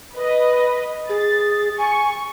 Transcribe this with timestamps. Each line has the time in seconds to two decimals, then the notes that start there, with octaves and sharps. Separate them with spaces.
0.14 B4 D#5
1.09 G#4 A6
1.78 G#5 C#6